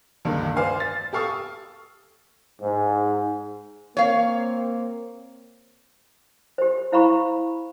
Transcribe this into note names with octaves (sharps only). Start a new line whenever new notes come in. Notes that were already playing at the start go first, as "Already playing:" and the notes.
C#2 G2 D3 D#3 A#3
C5 D5 F5 G#5
A6
G4 A4 F5 C#6 D#6 E6
G#2
A#3 C4 C#5 F5
G4 C5
E4 C5 F5 A#5 B5 C#6